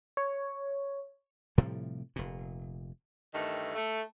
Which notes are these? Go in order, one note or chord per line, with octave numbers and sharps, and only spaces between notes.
C#5
A2 C3 F3 G3
F1 A#2
G2 D#3 E3 A3
A3